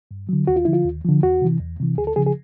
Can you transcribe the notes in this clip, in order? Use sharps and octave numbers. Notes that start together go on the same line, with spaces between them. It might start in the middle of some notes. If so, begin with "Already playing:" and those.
G2
D3 F#3
D#2 F#4
F4
D3 F3 E4
F4
D#2
D3 F3
E2 F#4
C3 E3
E2
C3 E3
D2 G#4
A4
C#3 F3 G#4
G#4